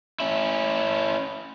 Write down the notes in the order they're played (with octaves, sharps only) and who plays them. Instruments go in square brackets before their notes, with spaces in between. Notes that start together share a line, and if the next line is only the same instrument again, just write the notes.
[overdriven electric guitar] C#4 E4